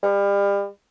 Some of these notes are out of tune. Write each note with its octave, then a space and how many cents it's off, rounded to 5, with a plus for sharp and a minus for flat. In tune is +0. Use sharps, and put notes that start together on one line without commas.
G3 +35